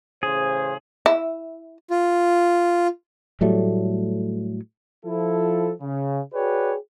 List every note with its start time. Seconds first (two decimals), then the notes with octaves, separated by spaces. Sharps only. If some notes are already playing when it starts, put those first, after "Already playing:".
0.23 A1 C#3 G#4 C5
1.06 E4
1.90 F4
3.41 A2 F#3 G3 A3
5.05 F3 E4 A4
5.82 C#3
6.34 F#4 G#4 B4 C#5 D5 G5